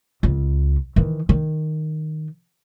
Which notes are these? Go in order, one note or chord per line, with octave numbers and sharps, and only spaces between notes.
C#2
D#3 E3
D#3